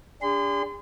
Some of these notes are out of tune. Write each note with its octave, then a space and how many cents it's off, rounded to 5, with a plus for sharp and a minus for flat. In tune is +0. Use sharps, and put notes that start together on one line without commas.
D4 -25 G#4 -45 C6 -35